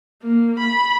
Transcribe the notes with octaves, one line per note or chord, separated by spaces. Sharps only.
A#3
B5